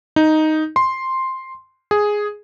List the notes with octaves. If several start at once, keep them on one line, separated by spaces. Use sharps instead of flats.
D#4
C6
G#4